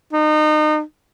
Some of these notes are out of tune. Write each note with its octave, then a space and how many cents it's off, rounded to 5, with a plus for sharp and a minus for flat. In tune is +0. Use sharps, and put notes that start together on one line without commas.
D#4 -30